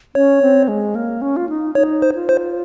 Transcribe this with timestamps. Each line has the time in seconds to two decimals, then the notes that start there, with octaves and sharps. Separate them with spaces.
0.15 C#4 C#5
0.42 C4
0.68 G#3
0.95 A#3
1.22 C#4
1.37 F4
1.49 D#4
1.75 D#4 C#5
2.02 C5
2.15 F4
2.29 C5